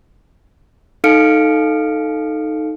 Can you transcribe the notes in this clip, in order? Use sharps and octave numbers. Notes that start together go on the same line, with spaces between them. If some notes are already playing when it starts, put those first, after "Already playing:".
D#4 A4 F5 F6 C#7 D7